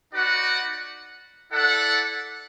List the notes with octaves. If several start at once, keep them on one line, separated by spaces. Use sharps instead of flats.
D#4 F#4 B4 D5 F#5
E4 A4 D5 F#5